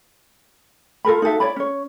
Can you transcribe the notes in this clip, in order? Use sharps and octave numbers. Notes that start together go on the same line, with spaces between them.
F4 A4 A#4 B5
D#4 F#4 A4 E5
E4 C#5 D5 B5
C#4 C#5